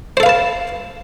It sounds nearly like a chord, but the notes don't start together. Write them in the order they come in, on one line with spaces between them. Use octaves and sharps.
C5 A4 F5 B4 A5